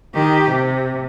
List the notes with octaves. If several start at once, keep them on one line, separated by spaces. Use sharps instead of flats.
D#3 G4
C3